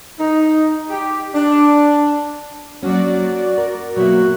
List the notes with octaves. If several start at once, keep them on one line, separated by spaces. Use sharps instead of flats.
D#4
G4
D4
F#3 A#3 C#4 F#4 D5
A#4
B2 F#3 A#3 B3 F#4 E5